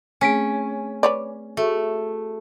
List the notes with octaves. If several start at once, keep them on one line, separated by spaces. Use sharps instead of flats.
A3 C4 C#4 G#4 G#5 B6 D7
B4 C#5 D5
A3 F#4 G#4 C#6